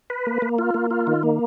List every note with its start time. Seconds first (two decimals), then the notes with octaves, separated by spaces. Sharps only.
0.10 B4
0.27 A#3
0.42 A#3
0.59 F4
0.74 A#3
0.91 F4
1.07 D#3
1.23 A#3